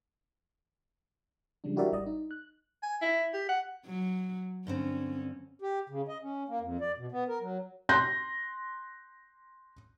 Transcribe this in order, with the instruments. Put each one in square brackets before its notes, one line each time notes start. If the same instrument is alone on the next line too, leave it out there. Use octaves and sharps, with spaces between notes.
[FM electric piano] C#3 F3 G3 G#3 D4
E4 F#4 G4 A#4 D5 E5
A1 G3 D5 D#5
D#4
F#6
[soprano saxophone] G#5
E4
G4
F#5
[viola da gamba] F#3
[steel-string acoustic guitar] G2 D3 C4 [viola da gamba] C#4
[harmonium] G4
C#3
D#5
C#4
A#3
F2
D5
B2
B3
A#4
F#3
[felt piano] C6 F#6 G6 A#6